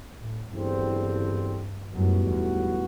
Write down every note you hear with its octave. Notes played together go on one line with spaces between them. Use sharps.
A2
F#1 E2 G2 D3 G3 C4
B1 F#2 A2 G3 B3 F#4
E2